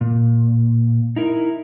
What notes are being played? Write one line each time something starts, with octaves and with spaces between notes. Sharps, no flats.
A#2
D#4 E4 A#4